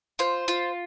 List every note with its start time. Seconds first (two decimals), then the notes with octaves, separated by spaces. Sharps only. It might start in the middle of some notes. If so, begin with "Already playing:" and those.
0.19 F4 C5
0.48 F4